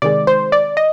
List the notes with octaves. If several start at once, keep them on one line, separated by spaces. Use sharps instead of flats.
C3 D#3 G#3 D5
C5
D5
D#5